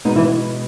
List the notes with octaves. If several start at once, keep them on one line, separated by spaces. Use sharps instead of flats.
B2 G#3 B3 D#4
E3 E4